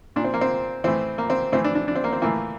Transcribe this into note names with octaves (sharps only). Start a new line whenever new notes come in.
A#2 D4
C4
A#3
C4
A2 E3 C4
A#3
C4
A2 E3 C4
D4
D4
D4
C4
A#3
C4
A2 E3 A#3